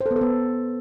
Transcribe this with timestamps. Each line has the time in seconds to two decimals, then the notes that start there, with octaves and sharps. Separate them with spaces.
0.01 C5
0.06 A4
0.11 B3
0.16 A4
0.21 B3